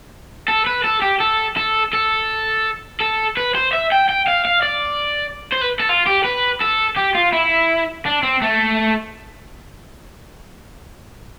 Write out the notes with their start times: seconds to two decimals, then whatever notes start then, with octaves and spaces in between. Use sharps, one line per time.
0.48 A4
0.67 B4
0.85 A4
1.02 G4
1.20 A4
1.57 A4
1.93 A4
3.00 A4
3.37 B4
3.55 C5
3.73 E5
3.92 G5
4.09 G5
4.27 F5
4.45 F5
4.62 D5
5.53 C5
5.62 B4
5.80 A4
5.89 F4
6.07 G4
6.25 B4
6.62 A4
6.97 G4
7.15 F4
7.33 E4
8.06 D4
8.23 C4
8.42 A3